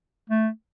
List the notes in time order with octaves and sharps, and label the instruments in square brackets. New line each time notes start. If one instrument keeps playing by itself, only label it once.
[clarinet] A3